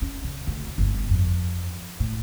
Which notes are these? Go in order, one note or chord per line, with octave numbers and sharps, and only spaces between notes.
C#4
C#3
D2
G1
F2
A2